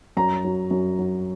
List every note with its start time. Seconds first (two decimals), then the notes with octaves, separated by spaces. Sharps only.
0.17 F#2 A#5
0.45 F#3
0.71 F#2
0.99 F#3